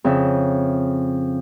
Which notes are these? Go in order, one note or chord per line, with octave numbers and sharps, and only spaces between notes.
F2 C#3 E5